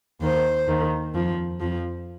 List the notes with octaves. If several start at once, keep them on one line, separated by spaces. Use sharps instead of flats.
D#2 D#3 C5
D#2 D#3
F2 F3
F2 F3